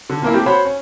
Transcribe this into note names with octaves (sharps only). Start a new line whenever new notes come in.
D3
A#2 A#3 E4
A3 C4 G4
F#4 C5 C#5 B5
C#4